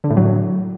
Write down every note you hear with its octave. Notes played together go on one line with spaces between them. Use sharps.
D3
A2
F#3